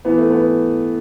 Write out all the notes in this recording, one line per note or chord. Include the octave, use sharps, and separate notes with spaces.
E3 B3
A3
B3